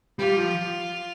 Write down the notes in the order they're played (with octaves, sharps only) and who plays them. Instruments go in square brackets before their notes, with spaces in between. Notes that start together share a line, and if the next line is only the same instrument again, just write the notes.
[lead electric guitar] G3 [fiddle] F4
[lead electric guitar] F3